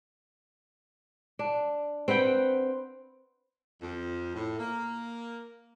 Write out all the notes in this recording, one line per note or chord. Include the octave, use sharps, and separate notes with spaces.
D4
C4 B4 F#5 G5
F2
A2
A#3